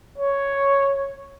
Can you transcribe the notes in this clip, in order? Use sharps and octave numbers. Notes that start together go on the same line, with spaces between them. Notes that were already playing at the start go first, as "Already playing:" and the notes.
C#5